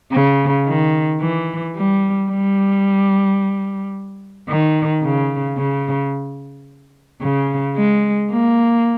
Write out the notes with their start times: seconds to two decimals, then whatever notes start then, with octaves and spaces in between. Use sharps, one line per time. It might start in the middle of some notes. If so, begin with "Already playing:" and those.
0.12 C#3
0.66 D#3
1.21 E3
1.76 G3
2.30 G3
4.49 D#3
5.03 C#3
5.57 C#3
7.22 C#3
7.76 G#3
8.31 A#3